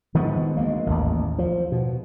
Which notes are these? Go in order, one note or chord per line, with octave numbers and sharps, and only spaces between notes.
D#3 F3 G#3 B3
D2 G#3 A#3
A1 D#2
F3
B2